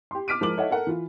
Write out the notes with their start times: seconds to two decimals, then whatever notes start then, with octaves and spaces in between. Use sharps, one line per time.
0.11 G4 C6
0.28 D6 F6 B6 D7 D#7
0.41 F3 G#3 A#4 D6 F#7
0.57 A4 C#5 D#5 E5 F#5
0.71 A4 A#4 F#5
0.87 E3 F4